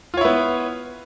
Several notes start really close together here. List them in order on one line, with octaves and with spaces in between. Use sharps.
F4 C#5 E4 B3